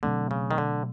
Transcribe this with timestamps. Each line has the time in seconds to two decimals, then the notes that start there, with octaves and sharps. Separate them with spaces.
0.03 B2 D3 F#3 A3 C4
0.31 C#3
0.51 D#3
0.58 D3